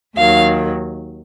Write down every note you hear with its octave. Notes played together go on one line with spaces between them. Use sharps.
D#2 D#3 F#3 F5